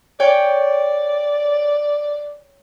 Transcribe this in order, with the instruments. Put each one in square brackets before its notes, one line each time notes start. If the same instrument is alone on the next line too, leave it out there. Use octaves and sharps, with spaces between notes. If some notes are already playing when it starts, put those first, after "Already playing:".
[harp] C#5 G5 [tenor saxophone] D5